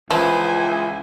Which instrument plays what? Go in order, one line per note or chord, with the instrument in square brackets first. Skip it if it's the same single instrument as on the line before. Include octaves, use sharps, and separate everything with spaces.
[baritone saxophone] C#2 [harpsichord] E3 [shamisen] F3 [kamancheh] G#5